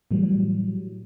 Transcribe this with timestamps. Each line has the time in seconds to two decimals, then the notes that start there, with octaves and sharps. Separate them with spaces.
0.11 A2 E3 F#3 G3